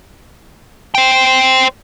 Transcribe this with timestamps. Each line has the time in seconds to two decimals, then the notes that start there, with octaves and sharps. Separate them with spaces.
0.95 C5 G5